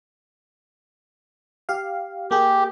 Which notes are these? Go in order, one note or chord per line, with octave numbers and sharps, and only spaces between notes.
G4 F5
A#3 G4 G#4